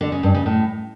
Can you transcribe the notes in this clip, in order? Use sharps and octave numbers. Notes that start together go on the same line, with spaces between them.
D3
C#3
G2
C#3
A2